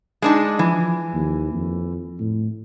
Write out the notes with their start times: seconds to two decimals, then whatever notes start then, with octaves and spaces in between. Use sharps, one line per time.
0.22 G#3 D4 D#4
0.59 E3 F3
1.14 D#2
1.54 F2
2.19 A2